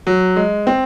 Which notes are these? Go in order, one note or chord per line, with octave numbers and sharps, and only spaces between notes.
F#3
G#3
C4